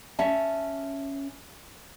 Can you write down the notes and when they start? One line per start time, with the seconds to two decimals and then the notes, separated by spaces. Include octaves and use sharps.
0.19 C#4 E5 A5